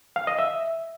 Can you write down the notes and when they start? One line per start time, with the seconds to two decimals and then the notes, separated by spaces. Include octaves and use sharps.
0.16 F5
0.27 D#5
0.39 E5